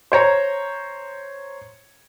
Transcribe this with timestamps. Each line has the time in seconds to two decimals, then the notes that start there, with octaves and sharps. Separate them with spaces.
0.12 C5 C#5 A#5 C#7